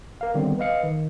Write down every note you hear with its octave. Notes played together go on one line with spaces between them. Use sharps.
A#4 F5
D3 D#3 G3 B3 C4
B4 D#5 F5 C#7
D#3